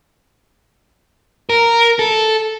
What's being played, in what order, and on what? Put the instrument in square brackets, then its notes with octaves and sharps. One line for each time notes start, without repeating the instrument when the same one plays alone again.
[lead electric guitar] A#4
A4